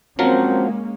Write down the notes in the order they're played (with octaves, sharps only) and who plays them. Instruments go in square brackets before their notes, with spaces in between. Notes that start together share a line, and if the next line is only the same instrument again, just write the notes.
[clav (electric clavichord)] F3 F#3 A#4 [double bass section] G#3 A#3 C#4 [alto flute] C4